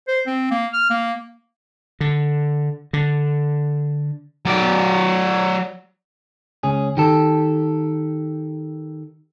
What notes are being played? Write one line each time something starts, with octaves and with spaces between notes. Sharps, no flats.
C5
C4
A#3
F6
A#3
D3
D3
F#3 D5
C#2 C#4 G#4
D#3 G4 A4